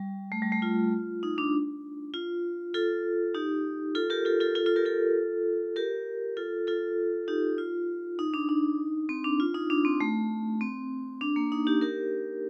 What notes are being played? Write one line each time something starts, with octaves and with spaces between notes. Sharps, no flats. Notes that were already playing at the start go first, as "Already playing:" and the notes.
Already playing: G3
A3
G3
A3
F4
D#4
D4
F4
F4 A4
D#4 G4
F4 A4
G4 A#4
F4 A4
F4 A4
F4 A4
F4 A4
G4 A#4
F4 A4
G4 A#4
F4 A4
F4 A4
D#4 G4
F4
D#4
D4
D#4
C4
D4
F4
D#4
D4
C4
A3
C4
D4
A#3
D#4
D#4 G4
G4 A#4